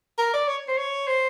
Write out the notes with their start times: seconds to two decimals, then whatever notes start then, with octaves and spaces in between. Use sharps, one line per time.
0.18 A#4
0.33 D5
0.48 C#5
0.68 C5
0.78 C#5
1.08 C5